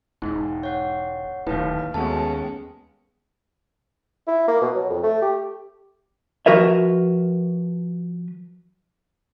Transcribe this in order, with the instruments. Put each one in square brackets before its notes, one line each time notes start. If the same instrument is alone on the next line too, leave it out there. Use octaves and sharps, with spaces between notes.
[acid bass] E1 [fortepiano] G#2
[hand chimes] C#5 F#5
[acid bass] D1 [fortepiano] D#2 A2 [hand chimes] B4 F5
[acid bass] D#2 [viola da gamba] G#3 B3 C#4 [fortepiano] A3 F#4 [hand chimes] A5
[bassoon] E4
A#3
B2
F#3
F2
A3
G4
[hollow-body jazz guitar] F3 F#4 A#4 B4 E5